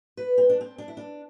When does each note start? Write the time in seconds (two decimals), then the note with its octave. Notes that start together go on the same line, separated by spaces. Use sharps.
0.17 B4
0.38 C4
0.49 D4
0.61 C4
0.78 D4
0.88 E4
0.97 D4